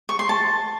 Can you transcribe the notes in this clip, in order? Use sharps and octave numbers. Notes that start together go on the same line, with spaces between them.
C#6
C6
A5